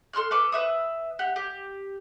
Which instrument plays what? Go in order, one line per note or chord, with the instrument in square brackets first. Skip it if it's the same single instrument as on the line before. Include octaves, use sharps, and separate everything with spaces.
[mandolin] A4 C6 F6 F#6
A4 B4 D6 F6
B4 E5 D#6
G4 F#5
G4